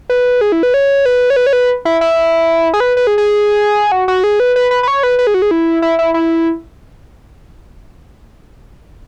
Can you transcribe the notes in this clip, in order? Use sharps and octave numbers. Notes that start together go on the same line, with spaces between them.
B4
G#4
E4
B4
C#5
B4
C#5
B4
C#5
B4
E4
E4
G#4
B4
B4
G#4
G#4
F#4
F#4
G#4
B4
B4
B4
B4
C#5
B4
B4
G#4
F#4
G#4
E4
E4
E4
E4